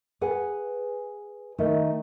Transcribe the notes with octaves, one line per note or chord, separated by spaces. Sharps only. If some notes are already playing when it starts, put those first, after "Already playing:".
G#4 B4 F#5 G#5
D#3 A3 D#4 E4